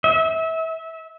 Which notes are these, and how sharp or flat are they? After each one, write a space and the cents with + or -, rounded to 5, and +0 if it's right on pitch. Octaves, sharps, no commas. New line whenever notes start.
E5 -25